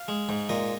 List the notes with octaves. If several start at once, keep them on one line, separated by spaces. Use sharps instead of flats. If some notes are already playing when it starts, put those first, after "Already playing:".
Already playing: F5
G#3
G#2
A#2 D#5